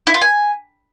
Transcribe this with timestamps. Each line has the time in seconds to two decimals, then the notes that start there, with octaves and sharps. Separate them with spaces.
0.07 E4
0.14 F4
0.21 G#5